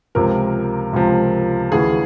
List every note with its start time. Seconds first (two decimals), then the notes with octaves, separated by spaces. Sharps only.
0.15 C#2 C3 F3 A#4
0.93 C#2 C3 F3
1.71 D2 C#3 E3 G#4